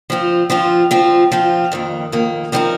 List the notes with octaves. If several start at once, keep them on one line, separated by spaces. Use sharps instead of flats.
F3 C4 F4
F3 C4 F4
F3 C4 F4
F3 C4 F4
F2 D#3 A#3
F2 D#3 A#3
F3 C4 D#4 G4 A#4